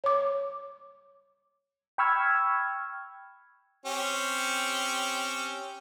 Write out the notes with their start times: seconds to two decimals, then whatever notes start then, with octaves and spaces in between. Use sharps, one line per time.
0.04 C#5 D6
1.98 G5 B5 C#6 E6 F6 G#6
3.86 C4 C#4 G4